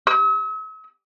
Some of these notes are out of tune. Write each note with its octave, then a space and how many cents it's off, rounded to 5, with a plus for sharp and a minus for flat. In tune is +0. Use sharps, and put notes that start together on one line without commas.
E6 -45